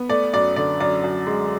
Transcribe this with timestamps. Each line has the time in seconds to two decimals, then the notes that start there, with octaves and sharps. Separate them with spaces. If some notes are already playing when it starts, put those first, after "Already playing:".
Already playing: B3
0.09 A3 D5
0.33 F#2 D5
0.56 D3 D5
0.80 F#2 D5
1.04 F#2
1.27 G#3